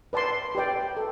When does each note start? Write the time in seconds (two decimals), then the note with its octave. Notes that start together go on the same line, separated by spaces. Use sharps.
0.13 B4 D5 A5 C6
0.55 G4 B4 D5 G5
0.97 A4